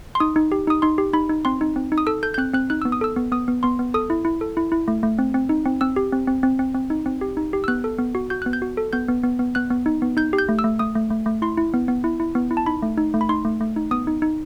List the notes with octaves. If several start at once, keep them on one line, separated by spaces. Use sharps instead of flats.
C6
D#4 D#6
D#4
G4
D#4 D#6
D#4 C6
G4
D#4 B5
D#4
C4 C6
D#4
C4
D#4
D#6
A4 E6
A4 G6
G6
C4 F#6
C4 F#6
D#4 F#6
B3 E6
D#6
A4 E6
B3
B3 D#6
B3
B3 C6
B3
A4 D#6
E4
E4
A4
E4
E4
A3
A3
C4
C4
D#4
C4
C4 E6
G4
C4
C4
C4
C4
C4
D#4
C4
G4
D#4
G4
E6
B3 F#6
A4
B3
F#4
F#4 G6
B3 F#6
G6
F#4
A4
B3 G6
B3
B3
B3
B3 F#6
B3
D#4
B3
D#4 G6
G4
G6
A3
E6
A3
A3 D#6
A3
A3
A3
E4 C6
E4
B3
B3
E4
E4
B3
E4
A5
D#4 B5
A3
D#4
A3
B5
D#4 C6
A3
A3
D#4
B3 D#6
D#4
D#4